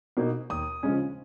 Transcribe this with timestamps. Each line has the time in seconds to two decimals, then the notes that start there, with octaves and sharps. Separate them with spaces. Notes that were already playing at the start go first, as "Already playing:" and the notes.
0.17 B2 A#3 D#4
0.50 D#2 D#6
0.83 C#3 F3 G#3 C#4